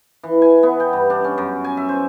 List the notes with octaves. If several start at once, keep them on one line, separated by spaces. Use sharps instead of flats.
E3
G#5
B3
G5
G2
D4
C#4
F#2
G#5
E5
C5